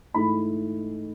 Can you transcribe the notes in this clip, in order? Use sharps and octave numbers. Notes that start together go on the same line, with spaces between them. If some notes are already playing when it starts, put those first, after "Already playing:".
G#2 E3 A3 B5